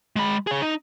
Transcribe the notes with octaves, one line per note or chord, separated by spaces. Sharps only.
G#3 B5
G#4 C#5
D#4